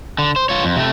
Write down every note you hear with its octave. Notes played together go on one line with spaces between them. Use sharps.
D3
C5
F4 C#5
F2
C3 A3